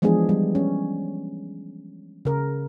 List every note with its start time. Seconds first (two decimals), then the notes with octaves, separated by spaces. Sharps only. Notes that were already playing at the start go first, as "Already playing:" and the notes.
0.02 E3 F3 G#3 B3 D4 G#4
0.29 G3
0.55 C#4
2.25 C#3 A#4